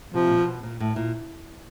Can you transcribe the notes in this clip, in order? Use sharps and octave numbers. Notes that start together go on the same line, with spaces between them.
C3 F3
A#2
B2
A#2
A2
A#2